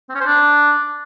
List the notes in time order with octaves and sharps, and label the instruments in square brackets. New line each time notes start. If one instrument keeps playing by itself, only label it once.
[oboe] C4
C#4
C5
D4